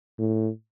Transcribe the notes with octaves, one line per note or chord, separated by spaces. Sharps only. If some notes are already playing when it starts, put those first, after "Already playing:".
A2